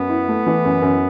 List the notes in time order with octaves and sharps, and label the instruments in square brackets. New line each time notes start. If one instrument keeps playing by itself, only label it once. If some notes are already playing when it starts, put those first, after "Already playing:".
Already playing: [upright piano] F#2 [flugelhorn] B3
[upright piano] E4
A3
E3
F#2
F#2